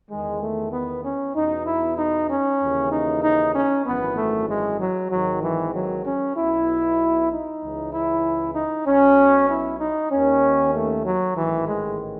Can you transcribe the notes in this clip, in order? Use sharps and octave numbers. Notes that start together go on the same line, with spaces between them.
E2 D#3 G#3
A3
B3
C#4
E2 B2 D#4
E4
D#4
C#4
D#2 C#3 E3
D#4
D#4
C#4
G#1 F#2 E3 B3
A3
G#3
F#3
G#1 G#2 D#3 F#3
E3
F#3
C#4
B1 B2 E4
D#4
C#2 C#3 E3
E4
D#4
B1 B2 C#4
E4
D#4
D#2 D#3 C#4
A3
F#3
A1 G#2 D#3 E3
G#3